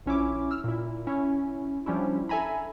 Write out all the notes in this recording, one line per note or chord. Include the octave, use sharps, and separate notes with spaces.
A#1 C#4 E4 D6
E6 F6
A#2 E4
C#4 E4
F3 G3 C#4 D4 E4
A4 E5 G#5 A#5 B5